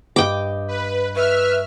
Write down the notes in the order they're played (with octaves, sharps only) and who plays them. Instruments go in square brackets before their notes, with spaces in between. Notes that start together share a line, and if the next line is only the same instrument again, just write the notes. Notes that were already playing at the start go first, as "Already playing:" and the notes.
[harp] G2 D#5 [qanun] G5 D6
[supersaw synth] B4
[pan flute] B4 [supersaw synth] E5 F6 [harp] C#6